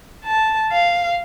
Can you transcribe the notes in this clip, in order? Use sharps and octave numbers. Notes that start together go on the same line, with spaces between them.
A5
F5